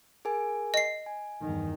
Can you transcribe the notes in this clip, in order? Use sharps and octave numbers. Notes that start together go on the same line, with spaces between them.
G#4 A#4 G#5
D#5 C7
G#5
E2 G2 D#3